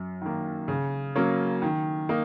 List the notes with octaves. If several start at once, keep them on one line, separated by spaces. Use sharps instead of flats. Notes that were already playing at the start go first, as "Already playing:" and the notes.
Already playing: F#2
D#3 A#3
C#3
F#3 A#3 C#4
D#3
A#3 D#4